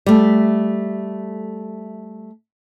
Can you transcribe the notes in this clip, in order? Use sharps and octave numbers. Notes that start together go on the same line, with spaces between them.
G3 A3